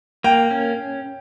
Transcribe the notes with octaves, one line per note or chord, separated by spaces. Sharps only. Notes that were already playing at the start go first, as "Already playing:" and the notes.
A#3 G5
C#4